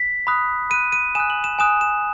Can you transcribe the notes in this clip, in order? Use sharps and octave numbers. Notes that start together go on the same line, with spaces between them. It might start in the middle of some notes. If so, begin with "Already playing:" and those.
Already playing: B6
B5 D#6 F#6
B5 F#6 D#7
D#7
G#5 D#6 F#6 E7
F#7
E7
G#5 D#6 F#6 E7
E7